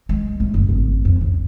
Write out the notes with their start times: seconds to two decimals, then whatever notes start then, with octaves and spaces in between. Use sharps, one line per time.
0.09 G#3
0.40 A2
0.54 F#1
0.69 G#1
1.05 F2
1.21 A1